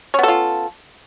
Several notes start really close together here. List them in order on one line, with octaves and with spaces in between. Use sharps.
C#4 B3 A4 F4